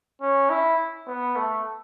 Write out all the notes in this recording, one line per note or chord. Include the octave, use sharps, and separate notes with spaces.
C#4
E4
B3
A3